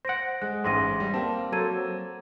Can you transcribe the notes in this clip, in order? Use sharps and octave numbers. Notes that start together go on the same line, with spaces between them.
C5 F#5 A#6 D7
G#3 F#6
A1 G#2 C6 A#6 D#7
G3
A#3 C4 A5
F#3 A4 C5 A#5 G#6 D#7